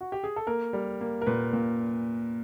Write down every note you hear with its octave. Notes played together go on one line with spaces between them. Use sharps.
F#4
G4
G#4
A4
A#3 A#4
G3
A#3
A#4
A#2 B4
A#2